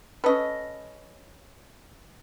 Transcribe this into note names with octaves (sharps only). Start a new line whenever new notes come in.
C#4 D#4 A4 B4 D#5